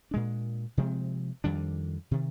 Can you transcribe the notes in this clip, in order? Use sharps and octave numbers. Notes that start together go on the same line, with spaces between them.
A#2 G#3 D4
C3 F3 G#3 C4
F2 D#3 G3 D4
C3 D#3